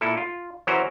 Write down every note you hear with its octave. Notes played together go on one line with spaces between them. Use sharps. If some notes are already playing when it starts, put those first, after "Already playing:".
A#2 E4 A4
F4
E3 F#3 C#4 F#4 A#4 C5